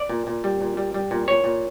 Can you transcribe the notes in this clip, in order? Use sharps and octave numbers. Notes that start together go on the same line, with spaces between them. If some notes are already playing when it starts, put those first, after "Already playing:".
Already playing: D5
A#2
A#2
G3
A#2
G3
G3
A#2
A#2 C#5
A#2